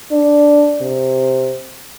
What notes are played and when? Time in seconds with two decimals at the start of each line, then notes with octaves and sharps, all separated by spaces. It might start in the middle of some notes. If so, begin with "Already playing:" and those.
0.12 D4
0.81 C3